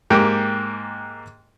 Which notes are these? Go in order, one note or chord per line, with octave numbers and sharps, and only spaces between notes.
G#2 A#3 G4 G5